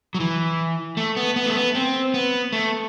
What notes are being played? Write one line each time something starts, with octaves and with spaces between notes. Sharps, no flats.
F#3
E3
A3
B3
B3
A3
B3
C4
B3
A3